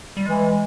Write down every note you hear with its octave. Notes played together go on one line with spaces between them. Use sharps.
G3
E3 G#3